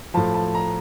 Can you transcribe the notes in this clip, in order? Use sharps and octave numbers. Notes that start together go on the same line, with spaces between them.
A2 F3 A5
A5
A#5